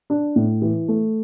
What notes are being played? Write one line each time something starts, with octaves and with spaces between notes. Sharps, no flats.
D4
A2
E3
A3